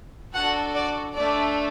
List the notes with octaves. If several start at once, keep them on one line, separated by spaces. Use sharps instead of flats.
D4 F#4 A4 F#5
D5
A3 D4 A4 D5